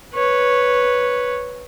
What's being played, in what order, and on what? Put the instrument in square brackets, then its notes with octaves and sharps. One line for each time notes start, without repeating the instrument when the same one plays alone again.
[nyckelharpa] B4 C#5